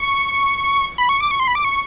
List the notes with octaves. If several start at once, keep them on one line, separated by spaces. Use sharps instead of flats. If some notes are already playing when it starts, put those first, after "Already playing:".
Already playing: C#6
B5
C#6
D6
C#6
C6
B5
D6
C#6